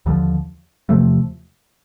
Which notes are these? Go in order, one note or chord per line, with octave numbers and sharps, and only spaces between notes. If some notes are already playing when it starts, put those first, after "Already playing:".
D#2 D3 F3
E2 C3 F3 A3